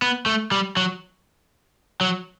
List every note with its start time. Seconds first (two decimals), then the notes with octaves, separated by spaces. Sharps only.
0.02 B3
0.26 A3
0.52 G3
0.77 F#3
2.01 F#3